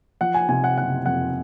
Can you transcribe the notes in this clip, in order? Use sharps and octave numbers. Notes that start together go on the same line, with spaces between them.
F3 F#5
G#5
C3 G#5
F#5
F#1 F#5
F2 F#5